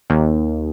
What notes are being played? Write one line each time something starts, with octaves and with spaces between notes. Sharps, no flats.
D#2